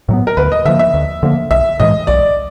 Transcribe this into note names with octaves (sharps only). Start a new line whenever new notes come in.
A2 F#3 B3
A#4
D2 B4
D#5
D3 F3 A#3 E5
E5
D2
D3 F3 A#3
B1 E5
A2 E3 G#3 D#5
B1 D5